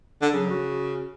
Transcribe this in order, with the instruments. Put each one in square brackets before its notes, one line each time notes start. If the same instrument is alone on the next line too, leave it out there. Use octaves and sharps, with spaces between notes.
[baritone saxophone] D3
[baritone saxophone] C#3 [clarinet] F#3
[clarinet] F#4